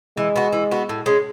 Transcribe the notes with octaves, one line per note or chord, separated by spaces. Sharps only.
E3 G#3
B3 F#4
E3
B3 F#4
A2
G#3 C#4